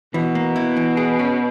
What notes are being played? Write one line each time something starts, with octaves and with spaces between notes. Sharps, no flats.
B2 E3
A#3
E4
E3
G#4
C#4